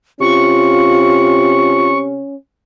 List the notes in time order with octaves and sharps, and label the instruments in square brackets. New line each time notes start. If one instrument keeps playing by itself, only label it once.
[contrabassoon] C3 [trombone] C#4 [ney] F4 [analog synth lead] C#6